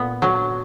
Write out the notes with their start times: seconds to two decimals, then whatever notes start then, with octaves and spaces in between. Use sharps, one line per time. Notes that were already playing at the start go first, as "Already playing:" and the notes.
Already playing: A#2 B3
0.22 F#3